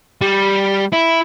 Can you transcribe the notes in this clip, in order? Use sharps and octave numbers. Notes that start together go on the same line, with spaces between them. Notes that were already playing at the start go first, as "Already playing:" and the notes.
G3
E4